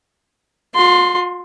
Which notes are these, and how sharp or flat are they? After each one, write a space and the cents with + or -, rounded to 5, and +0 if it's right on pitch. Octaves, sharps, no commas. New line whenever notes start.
F4 +45 C6 +0